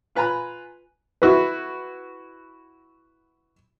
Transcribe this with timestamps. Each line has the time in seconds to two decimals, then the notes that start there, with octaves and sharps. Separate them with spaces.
0.15 F4 B4 G#5 A#5 B5 F#6
1.22 E4 F#4 B4